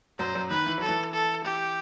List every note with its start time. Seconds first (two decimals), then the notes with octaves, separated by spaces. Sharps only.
0.19 F#2 F#3 C5
0.35 F#2 F#3
0.50 D#3 B4
0.66 E3
0.78 F#3 A4
0.89 E3
1.13 A4
1.44 G4